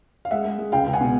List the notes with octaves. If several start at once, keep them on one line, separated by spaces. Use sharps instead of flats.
F5
G#3 E5 F#5
G#3
G#3
C#2 F5 G5
C#2
F#5 G#5
B2